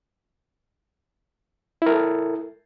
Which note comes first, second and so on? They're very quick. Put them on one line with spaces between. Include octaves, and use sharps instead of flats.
E4 A#4 A4